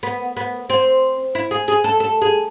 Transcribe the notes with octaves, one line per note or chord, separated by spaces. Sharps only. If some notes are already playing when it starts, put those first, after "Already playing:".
B3
B3
C4
E4
G#4
G#4
A4
A4
G#4